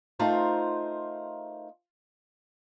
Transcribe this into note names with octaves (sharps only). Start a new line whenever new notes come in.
A3 D#4 F4 A#4 C5